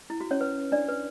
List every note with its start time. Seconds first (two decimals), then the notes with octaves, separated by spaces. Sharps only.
0.10 E4
0.20 F#4
0.31 C#4 C#5
0.41 B4
0.72 D4 D5
0.88 B4